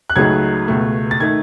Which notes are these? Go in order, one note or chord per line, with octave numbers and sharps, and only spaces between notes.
F#6
C#2 C#3 F#3 A3 D#4 G#6
C#2 B2 A3
A6
D#3 A3 D#4 G#6